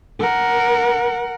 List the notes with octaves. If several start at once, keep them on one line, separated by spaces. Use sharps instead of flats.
A#4 F#5